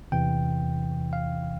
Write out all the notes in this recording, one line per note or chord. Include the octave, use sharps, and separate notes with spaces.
E2 C3 E3 G5
F5